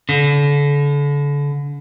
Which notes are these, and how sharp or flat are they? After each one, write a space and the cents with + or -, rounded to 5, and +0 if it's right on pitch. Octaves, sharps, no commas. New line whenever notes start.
D3 -35